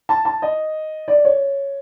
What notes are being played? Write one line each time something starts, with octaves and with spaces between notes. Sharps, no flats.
A5
A5
D#5
D5
C#5